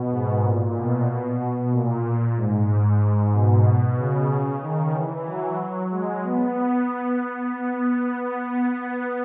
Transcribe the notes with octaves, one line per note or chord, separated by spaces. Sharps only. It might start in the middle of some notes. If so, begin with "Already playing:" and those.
Already playing: B2
G#2
A#2
B2
A#2
G#2
G#2
B2
B2
C#3
D#3
E3
F#3
G#3
B3
B3